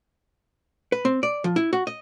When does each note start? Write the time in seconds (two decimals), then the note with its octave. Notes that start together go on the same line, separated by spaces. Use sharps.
0.92 B4
1.05 C4
1.23 D5
1.44 F3
1.56 E4
1.73 F#4
1.87 D#5